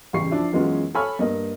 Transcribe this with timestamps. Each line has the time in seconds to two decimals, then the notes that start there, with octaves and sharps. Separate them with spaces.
0.13 A1 C#3 G3 C#6 C7
0.31 F3 D4 E4
0.53 F#2 E3 G#3 B3 C#4 F4
0.94 A4 C#5 G#5 B5 C#6 F6
1.19 G2 A#3 D#5